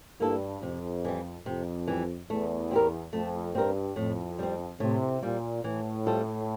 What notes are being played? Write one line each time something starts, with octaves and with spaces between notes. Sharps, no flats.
G2 A#3 E4 A4
F2 C3
E3 G3
F2 C3
E3 G3
E2 A3
C4 G4 A#4
F2 A3
G2 C4 G4 A#4
F2 A2
G3 C4
A2 C3
A#2 G3 C4
A2 E3
G3 C4 F4 A4